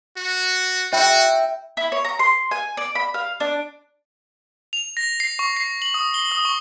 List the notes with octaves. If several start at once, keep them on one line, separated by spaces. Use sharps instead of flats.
F#4
E4 F#4 G5
E4
C#5
A#5
C6
G#5
D5
B5
F5
D4
F7
A#6
C7
C#6
C7
F#7
D#6
G7
D#6
C#6